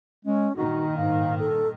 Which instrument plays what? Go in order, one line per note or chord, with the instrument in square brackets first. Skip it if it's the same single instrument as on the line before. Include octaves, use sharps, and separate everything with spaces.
[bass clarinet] G#3 [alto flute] C#4
[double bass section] G2 A#2 D#3 [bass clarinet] D#4 [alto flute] F#4
[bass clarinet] G#2 [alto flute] F5
[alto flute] A4